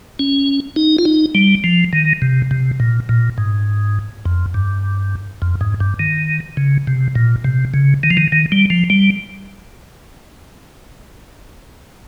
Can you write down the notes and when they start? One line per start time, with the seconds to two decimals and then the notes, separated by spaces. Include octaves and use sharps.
0.19 C#4
0.76 D#4
0.98 F4
1.05 D#4
1.35 G3
1.64 F3
1.93 D#3
2.22 C3
2.51 C3
2.80 A#2
3.09 A#2
3.38 G#2
4.25 F2
4.54 G2
5.42 F2
5.61 G#2
5.80 G2
5.99 D#3
6.57 C#3
6.87 C3
7.15 A#2
7.44 C3
7.74 C#3
8.03 D#3
8.10 F3
8.17 D#3
8.32 D#3
8.52 G3
8.70 F3
8.90 G3